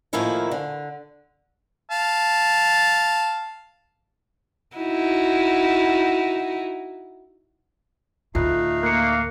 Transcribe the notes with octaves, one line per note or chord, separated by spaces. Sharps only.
A2 D#3 F3 A#3 E4 G#5
D3
F5 A5
D#4 E4 F#4
D2 A2 A3 D#4 F4 F5 F#6
A#3 F#6 C7 C#7